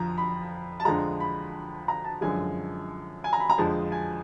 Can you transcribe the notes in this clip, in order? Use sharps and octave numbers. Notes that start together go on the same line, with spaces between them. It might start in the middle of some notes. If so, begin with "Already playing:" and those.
Already playing: F2 D3 F3 A#5
B5
A5
F2 D3 F3 G#3 A#5
B5
A#5
A5
F#2 D3 F3 G#3 G#5
G#5
A#5
B5
A#5
F2 D3 F3 G#3 A5
G#5